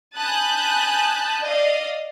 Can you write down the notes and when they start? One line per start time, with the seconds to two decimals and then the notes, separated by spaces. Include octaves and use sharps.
0.18 G#5 A5 B5 D#6 F#6 G6
1.41 D5 D#5 F5